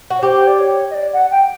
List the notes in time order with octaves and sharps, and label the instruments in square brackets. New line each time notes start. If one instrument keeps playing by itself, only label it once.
[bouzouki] F#4
[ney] C#5
[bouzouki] G4 [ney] C5
[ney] D5
C#5
D#5
D5
F#5
G5